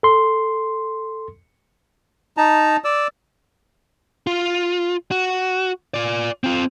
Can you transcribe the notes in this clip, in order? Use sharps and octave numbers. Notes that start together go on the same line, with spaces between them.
A4 C6
D#4 A5 A#5
D5 E6
F4
F#4
F4 D5
C4 F4